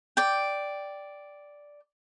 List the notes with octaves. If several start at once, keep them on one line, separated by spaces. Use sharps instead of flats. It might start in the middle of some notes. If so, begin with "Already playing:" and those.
D5 G5